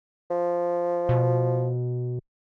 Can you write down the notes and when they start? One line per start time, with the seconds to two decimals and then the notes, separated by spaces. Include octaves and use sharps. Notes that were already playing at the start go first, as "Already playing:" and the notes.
0.30 F3
1.09 B2